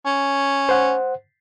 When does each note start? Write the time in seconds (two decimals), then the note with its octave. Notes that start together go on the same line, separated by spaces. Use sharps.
0.06 C#4
0.69 C5 F#5